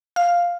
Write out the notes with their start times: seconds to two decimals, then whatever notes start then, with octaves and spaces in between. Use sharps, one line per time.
0.16 F5